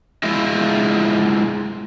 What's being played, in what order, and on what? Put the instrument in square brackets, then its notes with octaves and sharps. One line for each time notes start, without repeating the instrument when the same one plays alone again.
[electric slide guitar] G#3 E4 F4 C5 D#5 E5